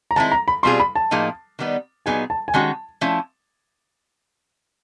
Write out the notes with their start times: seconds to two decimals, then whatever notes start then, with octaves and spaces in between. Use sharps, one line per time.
0.11 A#5
0.16 D#3 G#3 C4 E4 A5
0.32 A#5
0.48 B5
0.63 B2 G3 C4 F4 G#4 C6
0.80 B5
0.95 A5
1.11 A2 F3 A#3 D#4 G#4
1.59 D#3 G3 B3 D#4
2.06 A#2 F#3 B3 D#4 G#4 G#5
2.30 A5
2.48 G#5
2.54 D#3 G#3 C#4 F#4 A5
3.01 F3 A3 C#4 E4